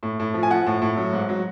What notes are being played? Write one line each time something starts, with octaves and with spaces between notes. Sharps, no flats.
A2
A2
F3
G#5
F3 F#5
A2
A2
F#3
G#2
F#3